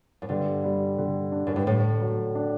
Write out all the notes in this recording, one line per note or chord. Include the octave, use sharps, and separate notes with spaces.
F#2
G2 D3
G3
D3
D4
F#2
G2
A2 D3
F#3
D4